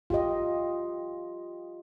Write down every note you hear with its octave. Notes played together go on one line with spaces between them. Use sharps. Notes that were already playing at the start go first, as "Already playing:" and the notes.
F4 G4 D#5